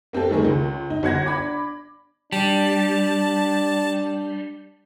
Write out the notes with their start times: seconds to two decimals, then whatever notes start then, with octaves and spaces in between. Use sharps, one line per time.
0.13 A#3 C4 G4 A4
0.31 D#3 G3 A3 C4 G#4 A#4
0.45 C#2
0.90 D#4
1.03 G1 F#5 G#6 A#6
1.26 D4 B5 D6
2.32 G3 D4 A5